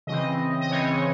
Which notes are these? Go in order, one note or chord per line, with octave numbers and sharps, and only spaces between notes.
C#3 E3 C4 D#5
D#5
C#3 E3 C4 C#5